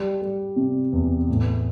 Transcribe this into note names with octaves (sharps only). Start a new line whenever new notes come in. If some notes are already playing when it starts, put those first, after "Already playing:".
Already playing: G3
G3
C3
E2
A2